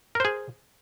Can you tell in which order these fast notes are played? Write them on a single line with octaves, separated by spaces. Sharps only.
A#4 C5 G#4